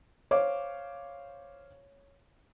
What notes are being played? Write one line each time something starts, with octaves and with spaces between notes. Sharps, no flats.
C5 C#5 F5 D6